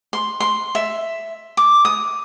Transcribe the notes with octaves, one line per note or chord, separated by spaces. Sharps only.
C6
C6
E5
D6
D#6